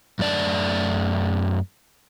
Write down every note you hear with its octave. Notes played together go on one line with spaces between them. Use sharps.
F#2 A3 D5 A5